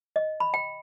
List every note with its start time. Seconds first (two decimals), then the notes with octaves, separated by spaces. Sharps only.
0.16 D#5
0.40 B5
0.54 G5